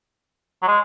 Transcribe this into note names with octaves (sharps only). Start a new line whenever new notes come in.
F#3
G#3